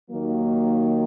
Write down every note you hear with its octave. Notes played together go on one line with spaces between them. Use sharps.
D#2 D#3 F#3 A#3